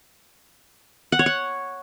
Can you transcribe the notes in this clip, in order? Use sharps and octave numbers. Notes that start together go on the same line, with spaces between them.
F#5
C#5
F#5